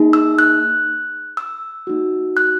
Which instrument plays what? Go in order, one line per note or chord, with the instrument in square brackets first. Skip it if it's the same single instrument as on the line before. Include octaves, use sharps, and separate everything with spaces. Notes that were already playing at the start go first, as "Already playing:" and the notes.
Already playing: [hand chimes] A#3 D#4 G#4
E6
F#6
E6
A#3 D#4 F#4
F#6